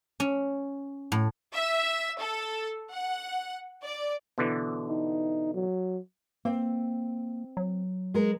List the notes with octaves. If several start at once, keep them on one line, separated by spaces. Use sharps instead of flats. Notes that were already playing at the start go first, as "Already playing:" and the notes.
C#4
A2
E5
A4
F#5
D5
B2 D3 E3
D#4
F#3
A#3 C4
F#3
G#3 A#4